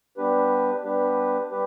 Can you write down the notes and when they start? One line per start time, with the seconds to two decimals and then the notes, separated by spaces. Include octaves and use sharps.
0.17 G3 B3 D4 G4 B4
0.84 G3 B3 D4 G4 B4
1.51 G3 G4 B4